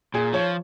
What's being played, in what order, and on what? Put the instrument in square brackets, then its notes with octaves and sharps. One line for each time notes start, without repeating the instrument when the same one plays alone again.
[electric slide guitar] A#2 [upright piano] G#4
[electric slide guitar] F3 [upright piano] C#5